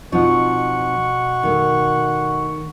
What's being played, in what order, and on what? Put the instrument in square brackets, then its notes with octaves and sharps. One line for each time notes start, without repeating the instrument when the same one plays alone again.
[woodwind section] B2 F#5 C#6 [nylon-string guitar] F3 C4 D#4
[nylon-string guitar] D#3 A3